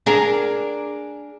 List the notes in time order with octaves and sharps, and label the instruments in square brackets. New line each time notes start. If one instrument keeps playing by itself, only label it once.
[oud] D4 G#4 A#4